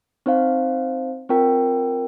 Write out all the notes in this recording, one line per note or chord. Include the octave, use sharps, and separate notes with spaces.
C4 D#4 C5 F5
C4 F4 A#4 G5